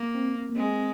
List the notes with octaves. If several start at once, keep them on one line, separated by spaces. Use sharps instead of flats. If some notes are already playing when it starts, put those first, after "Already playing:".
Already playing: A#3
C4
C4
A#3
G#3 C4